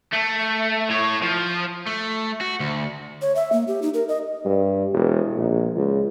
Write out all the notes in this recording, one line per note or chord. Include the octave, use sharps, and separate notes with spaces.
A3
A2 C#5
F3
A3
F#4
D2
C#5
E5
A#3
G4
D#4
A#4
D#5
G2
E1
A#1
C#2